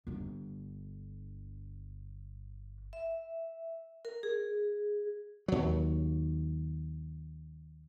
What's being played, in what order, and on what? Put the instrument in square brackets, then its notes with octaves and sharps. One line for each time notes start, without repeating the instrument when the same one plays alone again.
[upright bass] G1 D3
[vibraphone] E5
A#4
G#4
[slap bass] D#2 F#3